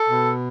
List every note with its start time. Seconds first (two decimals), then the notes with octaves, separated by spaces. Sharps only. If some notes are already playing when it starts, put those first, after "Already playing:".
Already playing: A4
0.09 B2